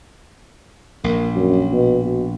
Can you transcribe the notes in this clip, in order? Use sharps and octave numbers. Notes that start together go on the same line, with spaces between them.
A#1 A#3
F#2
B2
B2